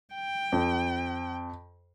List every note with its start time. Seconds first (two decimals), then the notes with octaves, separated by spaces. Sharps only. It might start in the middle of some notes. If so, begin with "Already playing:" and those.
0.14 G5
0.52 F2